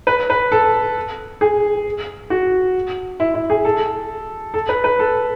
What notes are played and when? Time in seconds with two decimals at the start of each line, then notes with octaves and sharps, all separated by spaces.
0.07 B4
0.30 B4
0.52 A4
1.41 G#4
2.30 F#4
3.20 E4
3.34 E4
3.50 G#4
3.65 A4
4.54 A4
4.69 B4
4.84 B4
4.99 A4